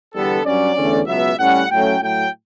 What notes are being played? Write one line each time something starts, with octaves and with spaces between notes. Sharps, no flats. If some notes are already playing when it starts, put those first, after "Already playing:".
E2 D3 G3 B3 A4
G2 F#3 C#4 D5
E2 D3 A3 C#4
C#2 B2 F#3 B3 E5
A2 G3 C#4 F#5
A2 F#3 A3 C#4 G5
A2 F#3 A3 G5